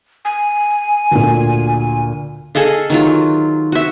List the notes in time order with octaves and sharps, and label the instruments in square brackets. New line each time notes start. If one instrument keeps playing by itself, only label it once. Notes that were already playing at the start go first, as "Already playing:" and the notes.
[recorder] G#5
[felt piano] D2 A#2
[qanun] G#4 A4 D#5 F5
D#3 F#3 F4
F#4 E5